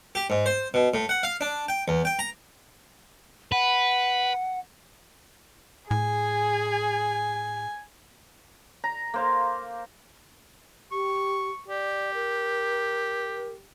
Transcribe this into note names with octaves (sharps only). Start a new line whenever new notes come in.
G4
G#2
C5
B2
A2
F#5
F5
D4
G5
E2
G5
A#5
B4 F#5
A2 G#4 G#5
A#5
A#3 C5 F5
G4 C#6
G4 D5
A#4